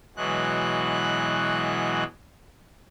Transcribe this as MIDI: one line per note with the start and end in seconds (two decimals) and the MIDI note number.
0.16 2.04 47
0.16 2.04 52
0.16 2.04 54
0.16 2.04 56
0.16 2.04 90